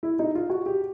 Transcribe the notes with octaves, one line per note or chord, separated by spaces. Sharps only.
E4
D#4
F4
F#4
G4